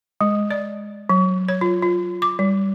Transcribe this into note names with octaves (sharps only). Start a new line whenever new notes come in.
G#3
D5
F#3
C#5
F4
F4
D6
G3